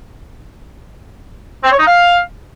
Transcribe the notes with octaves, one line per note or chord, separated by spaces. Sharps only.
C4
C#5
D#4
F5